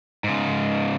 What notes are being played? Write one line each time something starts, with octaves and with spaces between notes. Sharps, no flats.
G#2 C#3